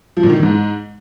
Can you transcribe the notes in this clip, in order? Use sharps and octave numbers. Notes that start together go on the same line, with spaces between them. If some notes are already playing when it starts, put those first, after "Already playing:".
F3
A#2
D#3
E3
G#2